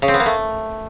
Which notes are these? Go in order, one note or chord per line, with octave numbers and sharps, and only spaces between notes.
C#3
C4
B3
A#3
A3